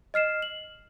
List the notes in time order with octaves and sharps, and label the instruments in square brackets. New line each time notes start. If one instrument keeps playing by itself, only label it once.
[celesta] D#5 F6 C7 E7
F#7